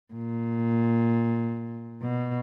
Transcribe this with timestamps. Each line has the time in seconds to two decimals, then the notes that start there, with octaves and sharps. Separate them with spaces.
0.14 A#2
2.02 B2